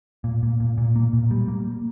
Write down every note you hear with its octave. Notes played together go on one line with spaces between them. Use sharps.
A#2
A#2
A#2
A#2
A#3
A#2
G3
A#3